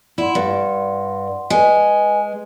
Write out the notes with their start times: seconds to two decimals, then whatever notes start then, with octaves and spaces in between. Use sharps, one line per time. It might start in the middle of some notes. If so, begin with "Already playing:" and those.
0.18 E4 D5 F#5 C6
0.35 G2
1.50 G#3 B4 D#5 G#5